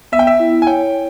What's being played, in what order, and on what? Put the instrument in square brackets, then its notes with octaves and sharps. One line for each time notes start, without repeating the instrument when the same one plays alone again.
[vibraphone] B3 [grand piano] E5
[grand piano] G5
E5
[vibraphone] E4
[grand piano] G#5
[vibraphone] C#5 [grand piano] G5